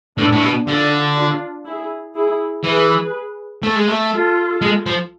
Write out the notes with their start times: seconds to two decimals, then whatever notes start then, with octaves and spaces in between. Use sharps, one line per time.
0.17 A2 B3 D4
0.32 A2
0.42 B2
0.66 D3 D4 F4
1.16 D4 F4
1.65 E4 G#4
2.15 E4 G#4
2.64 E3 G#4 B4
3.63 A3
3.76 G#3
3.88 A3
4.13 F4 A4
4.62 G#3
4.86 F3